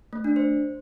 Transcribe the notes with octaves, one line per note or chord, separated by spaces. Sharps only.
A3
D4
C5